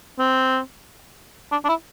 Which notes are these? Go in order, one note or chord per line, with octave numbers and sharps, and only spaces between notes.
C4
D4
D4
E4